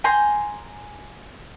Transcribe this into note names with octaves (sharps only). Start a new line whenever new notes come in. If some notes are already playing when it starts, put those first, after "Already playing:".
G#5 A#5 C6 G6